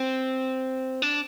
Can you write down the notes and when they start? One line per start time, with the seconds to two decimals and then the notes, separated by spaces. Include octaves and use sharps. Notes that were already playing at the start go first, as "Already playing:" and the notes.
Already playing: C4
1.02 D4